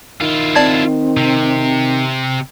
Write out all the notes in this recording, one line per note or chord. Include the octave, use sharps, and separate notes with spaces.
D#3 E4 F4
C4 D5 A5 G#6
C3